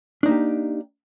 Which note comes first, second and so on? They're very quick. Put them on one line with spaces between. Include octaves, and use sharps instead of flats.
D4 D#4 A#3 G4